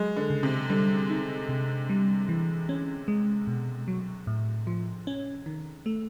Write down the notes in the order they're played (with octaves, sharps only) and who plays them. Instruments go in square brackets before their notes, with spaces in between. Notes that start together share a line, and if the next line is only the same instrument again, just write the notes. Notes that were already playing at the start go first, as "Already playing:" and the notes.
Already playing: [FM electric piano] F#3 [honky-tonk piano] G#3
[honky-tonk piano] D3
[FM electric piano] C#3
[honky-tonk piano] C3
[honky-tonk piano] D3 [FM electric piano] G3
[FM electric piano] D#4
C3
G3
E3
C#4
G#3
B2
F#3
A2
F3
C#4
D#3
A3